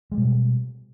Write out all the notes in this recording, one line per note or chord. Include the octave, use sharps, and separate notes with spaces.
B2 G3 G#3